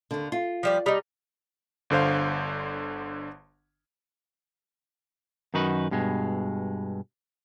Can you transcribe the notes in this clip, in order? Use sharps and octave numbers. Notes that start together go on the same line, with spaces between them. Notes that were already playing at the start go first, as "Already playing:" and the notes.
D#2 D3
F4
F3 G3 D5
G3 D#4
G1 D3 C5 F5
F#2 D#3 D#4 F#4 B4
G2 B2 G#3